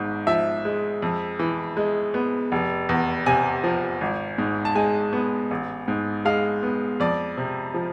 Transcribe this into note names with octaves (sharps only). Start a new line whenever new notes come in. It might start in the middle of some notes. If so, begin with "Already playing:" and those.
Already playing: G#1 G#2
F3 E5
G#3
F2
E3
G#3
B3
F1
E2
C3 G#5
F3
G#1
G#2
A5
G#3 G#5
B3
A1
G#2
G#3 F5
B3
F2 D5
C3
F3